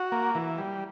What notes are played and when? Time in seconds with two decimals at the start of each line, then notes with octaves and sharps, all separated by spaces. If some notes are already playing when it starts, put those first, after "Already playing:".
Already playing: F#4
0.12 A#3
0.35 E3
0.58 G3